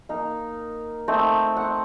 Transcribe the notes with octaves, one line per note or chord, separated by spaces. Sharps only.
A#3 D#4 F5
A3 C4 D#4
F#5